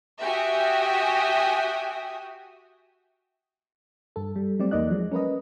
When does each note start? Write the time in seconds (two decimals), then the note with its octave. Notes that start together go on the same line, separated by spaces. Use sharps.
0.22 F#4 G4 E5 G5 G#5 D#6
4.16 G2 A4
4.36 G3
4.59 F#3 G3 A3 C4 D5
4.71 E2 A#3 D#4 D5 D#5 F#6
4.90 F3 F#3 G#3
5.12 C#4 A#4 B4 D#5